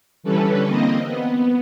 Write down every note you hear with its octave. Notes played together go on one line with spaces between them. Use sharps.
D3 E3 G3 C#4 A4 B4
A#3 C4 D#5
B3